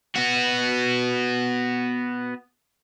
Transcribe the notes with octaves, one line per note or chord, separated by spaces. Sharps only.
B3 F#4